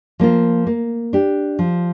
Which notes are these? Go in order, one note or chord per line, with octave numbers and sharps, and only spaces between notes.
F3 A#3 F4
A#3
D4 G4
F3